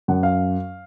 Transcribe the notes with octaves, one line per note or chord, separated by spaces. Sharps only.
F#2 F#5
F5